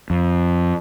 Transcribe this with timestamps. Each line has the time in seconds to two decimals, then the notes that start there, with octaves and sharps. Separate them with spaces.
0.10 F2